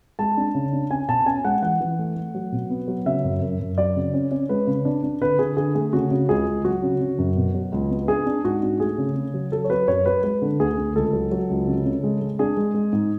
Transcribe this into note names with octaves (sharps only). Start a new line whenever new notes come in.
G#3 A5
D4
C#3
D4
C#4 G#5
B2 A5
C#4 G#5
G#3 F#5
E3 F#5
E3
A3
A3
F#3
B2
B3
F#3
C#3 E5
F#2
F#2
F#2
F#3 D5
C#3
C#4
C#4
G#3 B4
C#3
D4
D4
D3 B4
D3 G#4
D3 G#4
A3 G#4
C#3 F#4
C#3
C#2 G#4
C#2
F#3 F#4
C#3
C#3
F#2
B2
F#3
C#2
B3
D4 G#4
D4
G#2 F#4
D4
A3 G#4
C#3
C#3
F#3
F#3 A4
C#5
F#3 B4
F#2 C#5
F#3 B4
G#3 B4
D3
D2 G#4
D2
C#2 A4
F#3
F#3
C#2
C#3
C#3
G#3
G#3
D4 G#4
G#3
G#3
G#2